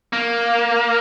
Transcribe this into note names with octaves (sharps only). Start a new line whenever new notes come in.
A#3